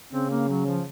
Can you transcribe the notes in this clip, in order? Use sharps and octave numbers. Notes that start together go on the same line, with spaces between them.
C#3 C4
A#3
F#3
F3